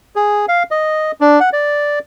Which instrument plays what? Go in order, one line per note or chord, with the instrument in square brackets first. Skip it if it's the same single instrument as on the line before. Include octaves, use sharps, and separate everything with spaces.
[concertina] G#4
F5
D#5
D4
F#5
D5